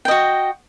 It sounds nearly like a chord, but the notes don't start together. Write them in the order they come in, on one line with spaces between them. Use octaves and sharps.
G5 D#5 F#4